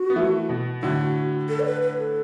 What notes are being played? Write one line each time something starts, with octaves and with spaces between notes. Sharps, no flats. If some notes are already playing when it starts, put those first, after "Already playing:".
Already playing: F#4
B3
E3 A3
B2
A2 D3 F#4
A4
D5
B4
B4
A4